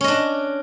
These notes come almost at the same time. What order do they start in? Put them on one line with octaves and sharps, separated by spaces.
C#4 D#5 D4